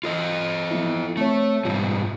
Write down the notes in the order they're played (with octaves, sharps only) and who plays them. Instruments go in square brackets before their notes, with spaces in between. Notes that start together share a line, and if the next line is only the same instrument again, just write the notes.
[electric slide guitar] F4 A4 D#5
[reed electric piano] F3 B3 E4
[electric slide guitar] A3 [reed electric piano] C4 C#5
[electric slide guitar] G#2 B2 G3 [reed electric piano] F4